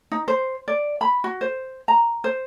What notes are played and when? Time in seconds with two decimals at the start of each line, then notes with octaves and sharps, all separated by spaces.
0.12 D#4
0.28 C5
0.68 D5
1.01 B5
1.24 F#4
1.41 C5
1.88 A#5
2.24 C5